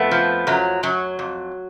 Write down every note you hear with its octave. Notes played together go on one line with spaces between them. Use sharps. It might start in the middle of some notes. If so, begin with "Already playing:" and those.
Already playing: F2 A3 B3
F3
F#2 F#3
F#2 F#3
F2